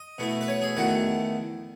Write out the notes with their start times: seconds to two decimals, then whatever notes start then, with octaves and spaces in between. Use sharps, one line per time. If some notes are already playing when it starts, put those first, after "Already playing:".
Already playing: D#5
0.18 B2 A3 E4
0.41 B4
0.48 C#5
0.62 G#4
0.77 E2 D#3 A3 F#4